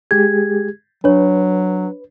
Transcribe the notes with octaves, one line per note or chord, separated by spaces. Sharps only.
G#3 G4 G#4 G#6
F#3 D4 B4 C#5